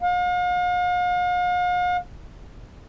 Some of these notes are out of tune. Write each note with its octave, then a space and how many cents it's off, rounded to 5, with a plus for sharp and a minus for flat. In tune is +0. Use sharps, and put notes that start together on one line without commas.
F5 +45